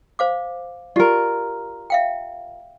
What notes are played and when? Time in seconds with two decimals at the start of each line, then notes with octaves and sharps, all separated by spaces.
0.19 C5 F5 D6
0.96 F4 G4 A#4 D5
1.90 E5 F5 G5